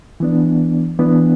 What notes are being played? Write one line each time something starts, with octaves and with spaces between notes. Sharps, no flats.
E3 B3 D4
E3 B3 D4